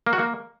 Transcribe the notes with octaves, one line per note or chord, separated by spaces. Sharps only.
A#3
F#4
A#3